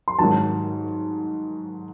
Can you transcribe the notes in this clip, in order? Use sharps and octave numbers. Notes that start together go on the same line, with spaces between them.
C6
G#2 D#3 F#3 A5